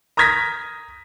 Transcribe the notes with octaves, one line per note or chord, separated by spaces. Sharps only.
A#5 D#6 F6 G#6 A#6 B6